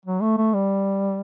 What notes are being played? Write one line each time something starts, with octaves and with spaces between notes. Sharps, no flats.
F#3
A3
A3
G3